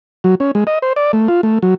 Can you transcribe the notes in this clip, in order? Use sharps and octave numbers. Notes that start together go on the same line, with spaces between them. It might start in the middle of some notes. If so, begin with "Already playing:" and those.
F#3
C#4
G#3
D#5
C5
D5
A3
F4
A3
F#3